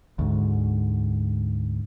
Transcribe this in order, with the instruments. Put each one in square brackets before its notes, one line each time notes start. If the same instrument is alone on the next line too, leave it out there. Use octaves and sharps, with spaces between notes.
[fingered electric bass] D2 G#2